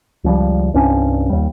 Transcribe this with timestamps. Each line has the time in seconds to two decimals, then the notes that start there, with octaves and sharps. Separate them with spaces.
0.24 C#2 F3 G3
0.74 C2 G2 C#4 D4
1.30 D#2 G3